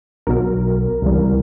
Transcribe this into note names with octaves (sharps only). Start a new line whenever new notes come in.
B1 B2 F#3 A#4
C#2 C3 E3 G3